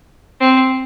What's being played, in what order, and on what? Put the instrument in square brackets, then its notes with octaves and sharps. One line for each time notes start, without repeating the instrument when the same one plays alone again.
[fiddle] C4